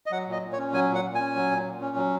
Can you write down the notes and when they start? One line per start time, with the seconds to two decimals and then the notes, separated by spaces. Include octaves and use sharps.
0.06 D#5
0.11 F#3 F#5
0.27 A#2 D#5
0.42 A#2
0.52 C#5
0.58 C#4
0.73 F#3 G#5
0.89 A#2
0.95 F#5
1.04 A#2
1.15 C#4 G#5
1.36 F#3
1.51 A#2
1.66 A#2
1.81 C#4
1.97 F#3